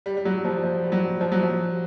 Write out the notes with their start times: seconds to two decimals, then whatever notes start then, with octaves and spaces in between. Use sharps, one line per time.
0.06 G3
0.17 G3
0.25 F#3
0.45 F3
0.64 F3
0.84 G3
0.92 F#3
1.21 F3
1.32 F#3
1.43 F3